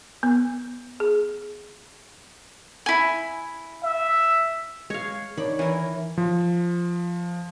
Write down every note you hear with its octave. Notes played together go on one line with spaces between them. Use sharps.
B3
G#4
E4 G#5
E5
G#3 C#5 F5
D#3 D4 C#5 B5
E3 A#4
F3